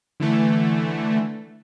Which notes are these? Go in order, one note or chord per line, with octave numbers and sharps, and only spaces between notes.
D3 E3 A3